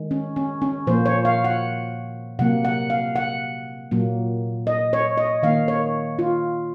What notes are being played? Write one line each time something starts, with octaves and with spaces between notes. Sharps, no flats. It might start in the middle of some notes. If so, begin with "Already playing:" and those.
Already playing: D#3 G#3
C#4
C#4
C#4
A#2 F3 A#3 C5
C#5
F5
F#5
C3 F#3 A#3 F#5
F#5
F5
F#5
A#2 F#3 A#3
D#5
C#5
D#5
D#3 A#3 F5
C#5
F4